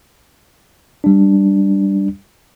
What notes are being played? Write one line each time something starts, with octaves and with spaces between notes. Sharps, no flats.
G3 D4